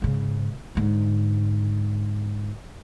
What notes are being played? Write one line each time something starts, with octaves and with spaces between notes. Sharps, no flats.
G#2 C#3
G#2 D3